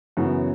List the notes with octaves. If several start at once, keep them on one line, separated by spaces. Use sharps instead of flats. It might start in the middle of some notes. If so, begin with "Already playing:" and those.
F#2 C#3 E3 B3 F#4